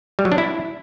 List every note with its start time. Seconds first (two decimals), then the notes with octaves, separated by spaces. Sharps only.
0.19 G3
0.25 F#3
0.32 D4
0.38 E4